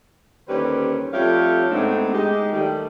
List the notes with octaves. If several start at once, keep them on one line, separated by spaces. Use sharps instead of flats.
D#2 D3 G3 C#4 B4 C5
F2 G3 A3 G4 C#5 F5
G#2 A3 B3 C4 D4 D#4
G#3 D#4 G4
D#3 G3 A3